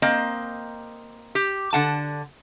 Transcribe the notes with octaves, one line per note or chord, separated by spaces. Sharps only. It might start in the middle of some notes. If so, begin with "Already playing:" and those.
A#3 C4 D#5
G4
D3 F#5 A5